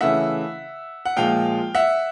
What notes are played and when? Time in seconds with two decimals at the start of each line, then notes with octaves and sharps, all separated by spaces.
0.01 C#3 E3 A3 E5 F#5
1.05 F#5
1.17 A#2 F3 G#3 F5 G5
1.75 E5 F#5